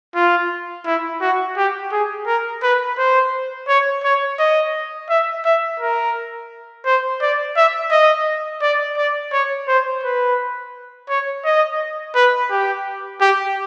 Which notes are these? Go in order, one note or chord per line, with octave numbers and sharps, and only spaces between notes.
F4
E4
F#4
G4
G#4
A#4
B4
C5
C#5
C#5
D#5
E5
E5
A#4
C5
D5
E5
D#5
D5
D5
C#5
C5
B4
C#5
D#5
B4
G4
G4